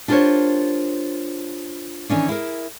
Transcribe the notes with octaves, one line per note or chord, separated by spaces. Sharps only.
D4 F4 G4 A#4 C5 C#5
D#3 E3 C#4 D4
E4 G#4 A#4